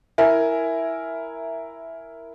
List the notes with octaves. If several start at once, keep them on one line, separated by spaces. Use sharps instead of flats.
E4 A#4 E5 G#5